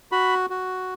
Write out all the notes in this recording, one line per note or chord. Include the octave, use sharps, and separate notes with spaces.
F#4 B5
F#4